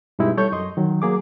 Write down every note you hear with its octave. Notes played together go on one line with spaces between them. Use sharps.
G2 B2 G#3 D#4 E4 G4
G3 A4 C#5 C#6 G6
F#2 D#5 C6
D#3 F#3
F#3 A#3 G#4 D6